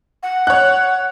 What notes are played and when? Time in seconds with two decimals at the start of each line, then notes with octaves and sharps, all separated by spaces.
0.23 F#5
0.47 C#5 F#6